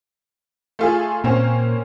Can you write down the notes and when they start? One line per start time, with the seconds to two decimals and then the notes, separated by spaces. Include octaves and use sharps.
0.79 A3 F4 G#4
1.24 A#2 A#3 C4 C#4